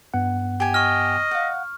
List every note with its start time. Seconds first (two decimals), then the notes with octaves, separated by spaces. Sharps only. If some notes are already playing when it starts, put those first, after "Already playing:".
0.14 G2 B3 F#5
0.60 G4 G#5
0.74 D#5 C#6 F6
1.31 F5 F#5